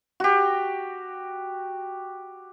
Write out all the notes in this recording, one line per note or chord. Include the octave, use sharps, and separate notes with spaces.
F#4 G4